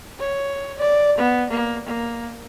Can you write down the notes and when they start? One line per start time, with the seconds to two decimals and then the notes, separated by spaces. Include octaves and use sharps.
0.19 C#5
0.78 D5
1.18 B3
1.50 A#3
1.86 A#3